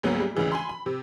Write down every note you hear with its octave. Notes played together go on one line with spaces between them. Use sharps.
D2 G#2 F#3 A#3 B3
G3
D2 C#3 E3 G#3
G#5 B5 C6
B5
C3